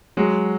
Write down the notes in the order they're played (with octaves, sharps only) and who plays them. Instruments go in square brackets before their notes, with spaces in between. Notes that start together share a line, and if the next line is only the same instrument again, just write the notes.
[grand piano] F#3 G#3